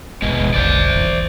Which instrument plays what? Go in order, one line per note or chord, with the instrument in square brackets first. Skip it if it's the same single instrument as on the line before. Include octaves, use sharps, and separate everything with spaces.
[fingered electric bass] G1 D#2 [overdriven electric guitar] B2 G#3
[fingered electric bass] F1 B1 D3 [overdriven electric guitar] C5 D5
[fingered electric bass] D#1 G#1 E2